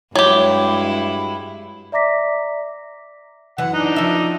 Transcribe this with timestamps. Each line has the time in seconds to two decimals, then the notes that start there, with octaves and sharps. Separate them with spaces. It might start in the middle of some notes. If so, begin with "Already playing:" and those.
0.16 G2 F#3 G#3 E4 G4
1.92 D5 E5 A#5 D6 A#6 B6
3.58 F#2 E3 F#5
3.74 D4 D#4
3.96 F3 E5